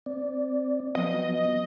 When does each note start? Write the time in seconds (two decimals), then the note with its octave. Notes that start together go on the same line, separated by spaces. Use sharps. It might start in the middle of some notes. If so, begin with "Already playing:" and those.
0.06 C4 D5
0.95 F3 F#3 B3 D#5